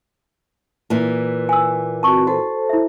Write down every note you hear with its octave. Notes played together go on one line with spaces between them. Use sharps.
A#2 E3
G#5 E6
C4 F#4 A5 C#6
F#4 A4 C5 A5
E4 E5